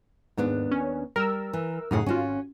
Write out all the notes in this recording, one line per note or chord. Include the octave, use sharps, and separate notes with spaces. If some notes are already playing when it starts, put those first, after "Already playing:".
D#2 G#2 B3 D4
C#4
G3 A#4 E6
E3
F#2 A2 C#3 D#4 G#4 F#5
G#1 C#4 F4 F#4